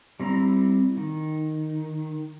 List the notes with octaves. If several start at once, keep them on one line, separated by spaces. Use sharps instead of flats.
G3 C4 E4 A#5
D#3